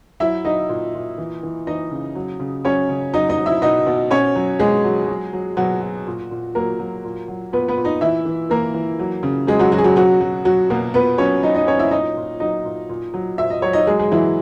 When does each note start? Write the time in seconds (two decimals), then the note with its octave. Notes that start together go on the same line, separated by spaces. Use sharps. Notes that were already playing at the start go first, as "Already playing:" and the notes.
0.20 F#3 E4 E5
0.45 F#3 D#4 D#5
0.69 A#2
0.94 A#2
1.18 E3
1.43 E3
1.67 E3 D#4 D#5
1.91 C#3
2.15 F#3
2.40 C#3
2.65 F#3 C#4 C#5
2.89 C#3
3.13 F#3 D#4 D#5
3.29 D#4 D#5
3.38 F#3
3.46 E4 E5
3.62 B2 D#4 D#5
3.87 B2
4.11 B2 C#4 C#5
4.36 F#3
4.59 B2 G#3 G#4
4.84 F#3
5.08 F#3
5.33 F#3
5.57 B2 F#3 F#4
5.81 F#3
6.07 A#2
6.31 A#2
6.55 F#3 A#3 A#4
6.79 F#3
7.04 A#2
7.28 F#3
7.53 A#2 B3 B4
7.68 B3 B4
7.77 A#2
7.85 D#4 D#5
8.01 E3 E4 E5
8.25 E3
8.50 E3 A#3 A#4
8.74 E3
8.99 F#3
9.23 C#3
9.47 F#3 G#3 G#4
9.59 F#3 F#4
9.72 C#3 F#3 F#4
9.78 G#4
9.84 F#3 F#4
9.96 B2 F#3 F#4
10.21 F#3
10.45 F#3 F#4
10.70 B2 A#3 A#4
10.94 A#2 B3 B4
11.18 F#3 C#4 C#5
11.42 F#3 D#4 D#5
11.55 D#4 D#5
11.67 F#3 C#4 C#5
11.79 E4 E5
11.91 A#2 D#4 D#5
12.17 A#2
12.40 F#3 D#4 D#5
12.65 A#2
12.89 A#2
13.14 F#3
13.38 A#2 E5
13.50 D#5
13.62 F#3 C#5
13.73 D#4 D#5
13.87 F#3 G#3 G#4
13.99 G#3 G#4
14.12 E3 F#3 E4